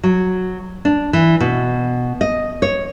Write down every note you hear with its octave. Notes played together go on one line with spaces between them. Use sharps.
F#3
D4
E3
B2
D#5
C#5